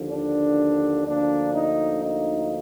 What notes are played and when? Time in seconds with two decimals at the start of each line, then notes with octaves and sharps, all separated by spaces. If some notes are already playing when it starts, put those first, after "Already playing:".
Already playing: D#2 D3 F3
0.10 D4
1.06 D2 D3 F3 A#3 D4
1.54 D#4
2.03 D#4